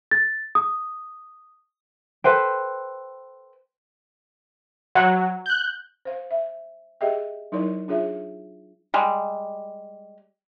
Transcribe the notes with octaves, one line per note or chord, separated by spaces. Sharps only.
A6
D#6
A4 B4 C5 G5
F#3 F#5
F#6 G6
C5 F5
E5
G4 G#4 D#5 E5 G5
F#3 D#4 E4 A#4 C#5 D5
D4 F4 G#4 C#5 E5
G3 G#3